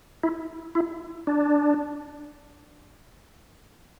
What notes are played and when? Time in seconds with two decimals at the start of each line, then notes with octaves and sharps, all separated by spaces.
0.23 E4
0.75 E4
1.27 D4